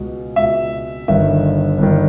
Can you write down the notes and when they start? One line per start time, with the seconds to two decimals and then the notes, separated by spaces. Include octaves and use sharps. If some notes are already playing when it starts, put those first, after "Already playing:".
Already playing: C#2 B2
0.36 C#2 E5
0.42 B2
1.08 G1 G2 D#3 E5
1.78 G1 G2 D#3